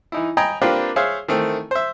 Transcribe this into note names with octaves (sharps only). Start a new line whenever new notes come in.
E3 D#4 E4
D#5 G5 G#5 A#5 B5
A#3 C4 D4 F4 G4 B4
G#4 C5 C#5 E5 F5
D#3 E3 A3 C4
C5 E5